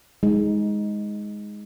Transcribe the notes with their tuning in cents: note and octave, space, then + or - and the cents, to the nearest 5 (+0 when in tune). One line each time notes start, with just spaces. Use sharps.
G#3 +0 D#4 +20